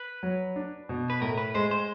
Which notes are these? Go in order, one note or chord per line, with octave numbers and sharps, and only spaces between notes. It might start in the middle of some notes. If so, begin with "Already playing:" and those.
Already playing: B4
F#3
D4
B2
B4
A2 A#4
B4
G#3 C5
C5